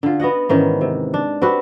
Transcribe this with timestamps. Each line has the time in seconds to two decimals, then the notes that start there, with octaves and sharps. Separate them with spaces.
0.03 D3 F4
0.20 B3 F#4 D#5 F#5
0.49 G#2 D#3 E3 C#4
0.81 C3
1.14 D4
1.42 C4 F#4 G4 B4